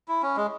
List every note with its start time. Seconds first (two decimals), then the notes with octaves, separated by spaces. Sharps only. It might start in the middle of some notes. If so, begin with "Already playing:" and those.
0.08 E4
0.22 C#4
0.36 G#3